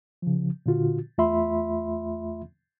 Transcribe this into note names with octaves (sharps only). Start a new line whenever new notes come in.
C#3 F3
A#2 D3 F4 F#4
E2 A3 F4 E5 B5 C6